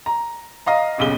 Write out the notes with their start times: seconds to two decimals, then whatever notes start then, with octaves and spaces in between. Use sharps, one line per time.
0.06 A#5
0.66 D#5 F5 A#5
0.98 D#1 B1 C#3 G7